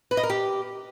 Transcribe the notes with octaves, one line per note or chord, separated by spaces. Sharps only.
B4
D#5
A#4
G4